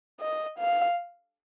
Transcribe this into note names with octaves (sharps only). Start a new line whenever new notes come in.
D#5
F5